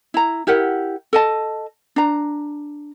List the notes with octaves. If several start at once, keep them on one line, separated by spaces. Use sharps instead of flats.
E4 A#5
E4 G4 A#4 F#5
A4 D#5 A5
D4 A#5